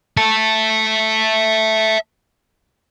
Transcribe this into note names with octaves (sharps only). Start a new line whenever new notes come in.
E5 A5